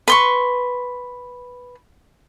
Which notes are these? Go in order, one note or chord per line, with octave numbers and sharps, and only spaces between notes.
B4 C6 C#6